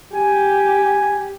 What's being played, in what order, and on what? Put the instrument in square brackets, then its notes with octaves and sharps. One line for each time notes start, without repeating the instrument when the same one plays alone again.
[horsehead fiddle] G4 [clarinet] G#5